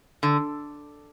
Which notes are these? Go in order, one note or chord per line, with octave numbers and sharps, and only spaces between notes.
D3